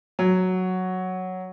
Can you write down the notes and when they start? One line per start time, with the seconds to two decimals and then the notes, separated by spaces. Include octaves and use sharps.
0.19 F#3